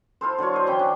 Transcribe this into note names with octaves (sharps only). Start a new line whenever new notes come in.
E4 F4 A4 C5
D3 F#3 F4 C#5
C5 D#5
D3 E3 C#4 G5
D4